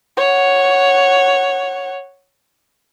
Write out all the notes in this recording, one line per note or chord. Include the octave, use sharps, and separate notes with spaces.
C#5 F#5